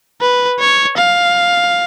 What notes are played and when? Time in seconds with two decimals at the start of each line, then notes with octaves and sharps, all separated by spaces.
0.21 B4
0.60 C#5
0.97 F5